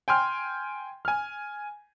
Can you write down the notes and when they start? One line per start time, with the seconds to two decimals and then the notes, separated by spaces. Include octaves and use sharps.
0.08 G5 G#5 C6 F6
1.05 G#5 F6